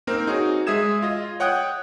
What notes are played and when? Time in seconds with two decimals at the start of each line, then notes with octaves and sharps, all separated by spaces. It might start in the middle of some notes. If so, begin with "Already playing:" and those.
0.07 A#3 C4 D#4 A#4
0.27 D#4 F#4 G#4 C#5
0.67 G#3 G#4 E5 D#6 G#6 E7
1.02 F4 D#5
1.40 C#5 F#5 G5 D#6 F#6